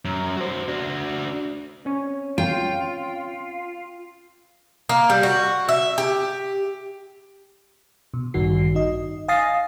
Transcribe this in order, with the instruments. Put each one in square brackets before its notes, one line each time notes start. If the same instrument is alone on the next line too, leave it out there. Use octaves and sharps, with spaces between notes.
[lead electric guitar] F#2
F#4 C5
D4 F#4
[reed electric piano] C4 C#4 C#5
[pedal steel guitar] F4 [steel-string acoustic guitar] G5
[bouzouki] A#3
G3
F#4
E5
G4
[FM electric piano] B2
A1 G2 D#3 F#4 C7
D#4 D#5
F5 G#5 D#6 A6 A#6 C7